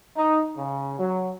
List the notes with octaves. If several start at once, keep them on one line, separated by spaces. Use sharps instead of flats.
D#4
C#3
F#3